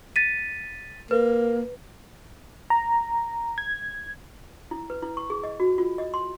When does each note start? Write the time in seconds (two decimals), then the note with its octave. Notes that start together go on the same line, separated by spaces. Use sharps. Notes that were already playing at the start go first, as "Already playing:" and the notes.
0.16 A6 B6 D#7
1.11 A#3 B4
2.70 A#5
3.58 G#6
4.71 E4
4.90 B4
5.03 E4
5.17 C#6
5.30 G#4
5.44 D#5
5.60 F#4
5.78 F4
5.98 D#5
6.14 C6